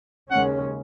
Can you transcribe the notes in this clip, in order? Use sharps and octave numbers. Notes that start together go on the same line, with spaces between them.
D#2 C#3 G#3 C#4 F#5